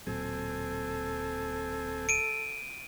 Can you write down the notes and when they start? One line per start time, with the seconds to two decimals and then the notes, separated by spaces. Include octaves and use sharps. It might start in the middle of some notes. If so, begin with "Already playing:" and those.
0.07 D1 A#2 F#3 C4 A4 G#5
2.09 D7 D#7